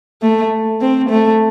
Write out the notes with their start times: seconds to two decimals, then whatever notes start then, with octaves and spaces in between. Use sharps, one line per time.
0.22 A3
0.81 C4
1.10 A3